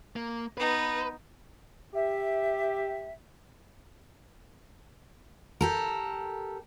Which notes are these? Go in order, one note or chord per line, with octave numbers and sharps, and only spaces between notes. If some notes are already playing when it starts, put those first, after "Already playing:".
A#3
B3 D#4 B4
G4 E5
G4 A4 A#4